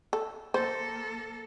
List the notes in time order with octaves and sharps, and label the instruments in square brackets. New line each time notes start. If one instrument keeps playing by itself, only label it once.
[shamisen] A4
[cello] A#3 A4 [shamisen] C5